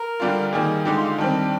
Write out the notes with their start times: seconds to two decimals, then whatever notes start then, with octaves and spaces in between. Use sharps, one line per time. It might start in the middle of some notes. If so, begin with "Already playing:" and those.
Already playing: A#4
0.20 D3 G3 D4 F4
0.53 D#3 G3 A#3 G#4
0.85 D3 G#3 D#4 G4
0.97 F4
1.04 G4
1.08 F4
1.18 D#3 G3 C4 D4